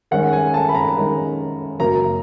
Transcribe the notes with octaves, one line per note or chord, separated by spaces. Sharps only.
D#3 G#3 C#4 F#5
G#5
A5
B5
A#5
D#3 G#3 C#4
F#2 C#3 F#3 A#3 A#5